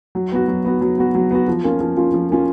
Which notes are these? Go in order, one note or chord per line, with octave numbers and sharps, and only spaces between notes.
F#3
B3 F#4
F#3
B3 F#4
F#3
B3 F#4
F#3
B3 F#4
F3
A#3 C#4 F4
F3
A#3 C#4 F4
F3
A#3 C#4 F4